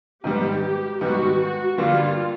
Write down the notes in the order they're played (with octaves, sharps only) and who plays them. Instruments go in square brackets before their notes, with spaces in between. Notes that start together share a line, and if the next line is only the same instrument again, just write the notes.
[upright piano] G#2 D#3 G3 B3 [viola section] G4
[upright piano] G#2 D#3 G3 B3 [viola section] F#4
[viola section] F#4
[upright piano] G2 D3 G3 A#3 [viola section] F4